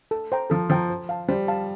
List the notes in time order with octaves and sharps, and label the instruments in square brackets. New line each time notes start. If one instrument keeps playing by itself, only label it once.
[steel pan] A4
C5 G5 A#5
[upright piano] F3 [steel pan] A4
[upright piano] F3 [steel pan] C5 G5 A#5
[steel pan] C5
F5 A5
[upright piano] G3 [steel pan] C5
[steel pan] F5 A5